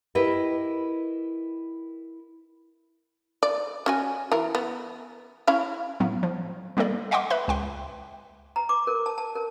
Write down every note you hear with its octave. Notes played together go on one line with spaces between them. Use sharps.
E4 G4 A#4 B4 D#5 E5
D5
C#4 F#4 G#5
E3 A#4
B3
C#4 E4 F5
A2 F#3 B3
F3
G3 A#3 C4 A4 D5
D#5 E5 F#5 G5 C6 D6
B4 E5 B5
C#2 G5 C6
A#5
D6
A#4
A5
A5
A#4